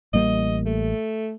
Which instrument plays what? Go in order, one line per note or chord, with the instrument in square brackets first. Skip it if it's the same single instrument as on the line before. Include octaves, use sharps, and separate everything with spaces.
[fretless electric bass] A1 G3 A#3 [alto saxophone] D#5
[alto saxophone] A3